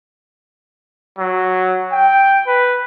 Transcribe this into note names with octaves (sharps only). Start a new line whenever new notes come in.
F#3
G5
B4